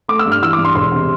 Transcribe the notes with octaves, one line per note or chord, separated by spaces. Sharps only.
A3 D6
E6
G2
F6
E3 E6
D6
G2
C6
E1 C6
C3